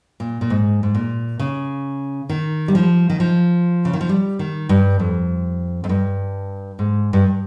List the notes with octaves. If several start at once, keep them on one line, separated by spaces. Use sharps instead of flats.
A#2
A#2
G#2
G#2
A#2
C#3
D#3
G3
F3
D#3
F3
C#3
D#3
F3
G3
D#3
G2
F2
F2
G2
G#2
G2